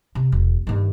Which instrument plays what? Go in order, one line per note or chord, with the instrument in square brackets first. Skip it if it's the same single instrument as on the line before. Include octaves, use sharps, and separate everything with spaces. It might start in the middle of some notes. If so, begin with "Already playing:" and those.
[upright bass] C3
E1
G2 D#3